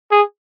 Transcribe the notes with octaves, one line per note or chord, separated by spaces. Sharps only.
G#4